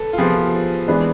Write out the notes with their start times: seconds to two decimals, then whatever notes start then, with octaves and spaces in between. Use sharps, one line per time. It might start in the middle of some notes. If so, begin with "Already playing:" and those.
Already playing: A4 B4
0.13 F4
0.18 C3 F3 B3 G#4
0.88 E3 G#3 B3 D4